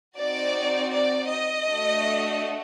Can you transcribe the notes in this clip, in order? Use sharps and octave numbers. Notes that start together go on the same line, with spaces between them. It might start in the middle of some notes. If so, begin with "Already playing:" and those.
C4 D#4 F#4 D5
D5
D#5
A3 D4 F#4 A4